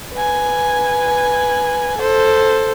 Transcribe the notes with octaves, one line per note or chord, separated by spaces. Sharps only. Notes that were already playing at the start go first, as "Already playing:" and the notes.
B4 G#5
A4 C5